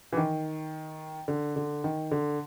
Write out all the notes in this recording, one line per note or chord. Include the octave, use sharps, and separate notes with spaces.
E3
D#3
D3
D3
D#3
D3